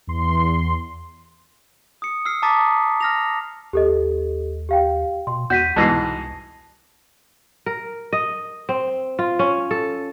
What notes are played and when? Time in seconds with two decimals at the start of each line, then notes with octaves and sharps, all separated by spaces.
0.07 E2 C6
2.02 D#6 C#7
2.26 E6 F6 C7
2.42 A5 A#5 D6 D#6 A6 B6
3.01 F6 A#6 F7
3.73 D#2 G4 A4 D#5
4.69 G4 F5 G5
5.27 B2 C6
5.50 E2 F#4 G6 B6 D#7
5.76 C2 G#2 B2 E3 A5 A#6 C7
7.66 A#4
8.13 D#5
8.69 C4
9.19 F4
9.39 C#4
9.71 A4